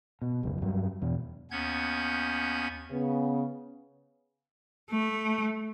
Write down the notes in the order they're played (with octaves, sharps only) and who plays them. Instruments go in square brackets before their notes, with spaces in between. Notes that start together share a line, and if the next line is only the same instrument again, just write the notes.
[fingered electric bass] B2
F1 C#2 F#2
G2 F#3
E2 B2
[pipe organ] D#2 B3 C#4 G6 G#6
[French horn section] C#3 B3
[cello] A3